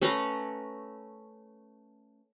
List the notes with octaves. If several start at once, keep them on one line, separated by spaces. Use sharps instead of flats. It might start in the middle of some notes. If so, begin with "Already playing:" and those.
A3 C#4 B4 A#5